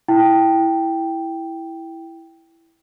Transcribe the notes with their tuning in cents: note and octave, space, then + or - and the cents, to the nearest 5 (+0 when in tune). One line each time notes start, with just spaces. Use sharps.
E4 +0 G5 +0